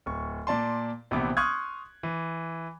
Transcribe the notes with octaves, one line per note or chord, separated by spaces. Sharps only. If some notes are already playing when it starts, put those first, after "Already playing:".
D1 C#6
A#2 D5 A5 C6
A#1 C3 E3 B3 D6
C6 C#6 D#6 F6 F#6 G#6
E3